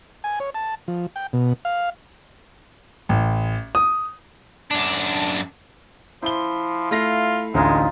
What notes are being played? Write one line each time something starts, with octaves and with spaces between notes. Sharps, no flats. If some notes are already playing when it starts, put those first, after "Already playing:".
G#5
C#5
A5
F3
G5
B2
F5
A1
D#6
F#2 D4
F3 E4 C5 G7
A3 F4 F5 A#6
A1 D2 G#3 D#4 F4